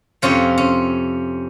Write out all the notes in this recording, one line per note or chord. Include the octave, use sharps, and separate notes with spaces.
F2 C3 F3 C#4 F4
C#4